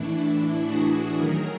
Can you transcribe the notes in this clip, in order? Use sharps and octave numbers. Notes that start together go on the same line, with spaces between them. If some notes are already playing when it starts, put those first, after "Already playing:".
Already playing: A2 E3 A3 D4 E4
F#4 G#4
D#3 F#3 A3 G#4 A#4